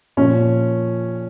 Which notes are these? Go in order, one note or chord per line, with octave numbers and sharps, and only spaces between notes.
A#2 F3 C#4